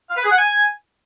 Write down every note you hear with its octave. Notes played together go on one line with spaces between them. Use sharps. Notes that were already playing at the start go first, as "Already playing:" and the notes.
F5
B4
G#4
F#5
G#5